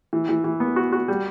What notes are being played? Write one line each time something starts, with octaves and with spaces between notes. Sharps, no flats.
E3
E3
E3
B3
F#4
F#4
G3